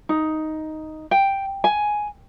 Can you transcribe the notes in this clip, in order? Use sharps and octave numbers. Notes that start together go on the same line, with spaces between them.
D#4
G5
G#5